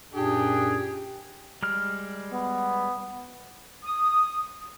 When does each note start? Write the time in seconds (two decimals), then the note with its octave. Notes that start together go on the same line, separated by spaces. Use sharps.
0.14 F#2 A#2 D4 G4 G#4
1.63 G3 G#3 F6
2.33 B3
3.83 D#6